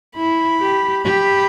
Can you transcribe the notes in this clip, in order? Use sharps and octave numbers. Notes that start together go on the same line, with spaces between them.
E4 B5
G4
G4 B5